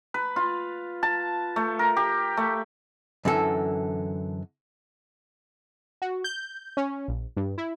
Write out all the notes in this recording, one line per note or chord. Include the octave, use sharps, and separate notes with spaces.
B4
F4
A5
A3
A#4
G4
A3
F#2 D3 E3 A4
F#4
G6
C#4
A#1
G2
E4